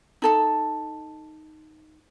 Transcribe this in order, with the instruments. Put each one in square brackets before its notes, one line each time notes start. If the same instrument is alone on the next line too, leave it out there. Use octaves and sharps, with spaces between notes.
[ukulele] D#4 A4 A5